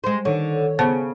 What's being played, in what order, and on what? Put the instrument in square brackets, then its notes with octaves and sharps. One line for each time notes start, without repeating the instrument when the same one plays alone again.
[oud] G#3 C5
[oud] D3 [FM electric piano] D#3 C#5
[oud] C#3 [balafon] B3 C5 A5